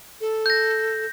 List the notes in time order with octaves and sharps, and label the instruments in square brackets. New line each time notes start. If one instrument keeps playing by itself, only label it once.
[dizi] A4
[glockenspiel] G6 A#6